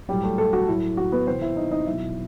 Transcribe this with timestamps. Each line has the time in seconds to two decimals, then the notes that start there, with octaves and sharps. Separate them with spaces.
0.09 A2 F#3 G3 G4
0.23 A3 A4
0.38 A3 A4
0.53 F#4
0.68 A2 F#3 E4
0.97 F#4
1.12 B3 B4
1.27 C3 E3 C4 C5
1.42 E4 E5
1.57 D#4 D#5
1.71 D#4 D#5
1.86 B2 F#3 E4 E5